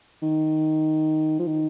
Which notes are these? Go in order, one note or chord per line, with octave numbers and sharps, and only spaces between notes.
D#3
F3
D#3